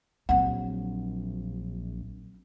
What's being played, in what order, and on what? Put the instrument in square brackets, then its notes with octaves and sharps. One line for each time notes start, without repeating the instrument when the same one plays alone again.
[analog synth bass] A#1 [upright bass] F#3 C4 [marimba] F#5